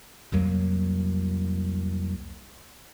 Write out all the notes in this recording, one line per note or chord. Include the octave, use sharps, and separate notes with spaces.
C2 F2 F#3 A#3